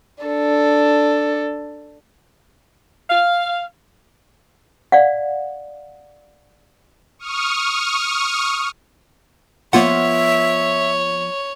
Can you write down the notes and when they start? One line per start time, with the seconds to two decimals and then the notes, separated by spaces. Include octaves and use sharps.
0.24 D4 A4
3.08 F5
4.92 D5 F5 F#5
7.19 C#6 D#6 F6
9.73 F3 A#3 B3 F4 C#5 E5 F#5